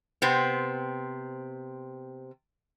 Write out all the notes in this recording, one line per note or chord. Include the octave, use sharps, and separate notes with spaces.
C3 B3 C4